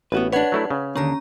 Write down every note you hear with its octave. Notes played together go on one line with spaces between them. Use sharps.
A1 B3 F#4 B4
D4 B4 C#5 F#5 G#6
F#3 A3 E4
C#3
D#2 D3 C#4 A#5